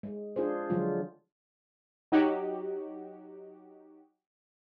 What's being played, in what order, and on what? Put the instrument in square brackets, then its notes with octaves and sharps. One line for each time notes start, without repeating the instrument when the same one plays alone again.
[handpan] G#3
D4 F4 G#4 C5
D3 F3 F#3 G#3 F4
[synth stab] F#3 D#4 F#4 G4